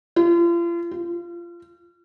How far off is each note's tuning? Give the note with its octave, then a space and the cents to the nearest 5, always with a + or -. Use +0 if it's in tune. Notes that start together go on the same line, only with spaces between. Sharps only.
F4 -40
F4 -20